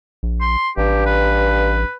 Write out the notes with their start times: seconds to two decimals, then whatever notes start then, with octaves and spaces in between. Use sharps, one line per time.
0.23 A#1
0.41 C6
0.78 A1 G2 G4
1.06 B4